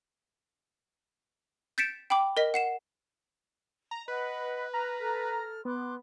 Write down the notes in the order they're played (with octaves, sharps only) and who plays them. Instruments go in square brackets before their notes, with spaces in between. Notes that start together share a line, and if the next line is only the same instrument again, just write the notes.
[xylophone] G6 A6 B6 C#7 D7 E7
G5 B5 D6
A#4 D#5 B6
F#5 C7 E7
[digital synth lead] A#5
[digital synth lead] B4 [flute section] D#5 F#5 B5
[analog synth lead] A#5 [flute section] F6
[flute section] A4 F6
[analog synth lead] B3 [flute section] C6 D6 F#6